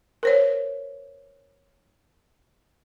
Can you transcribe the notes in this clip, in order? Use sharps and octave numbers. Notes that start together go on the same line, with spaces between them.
A#4 C5 C#5